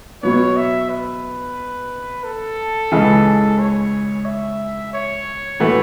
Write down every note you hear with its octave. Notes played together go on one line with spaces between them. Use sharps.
B2 F#3 B3 C#5
E5
B4
A4
C#2 C#3 E3
C#5
E5
C#5
A2 E3 A3 F#4 B4